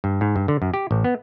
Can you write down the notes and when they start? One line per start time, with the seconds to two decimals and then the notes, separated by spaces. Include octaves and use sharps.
0.04 G2
0.21 G#2
0.36 G2
0.48 D3
0.62 F#2
0.74 G4
0.91 A1
1.04 B3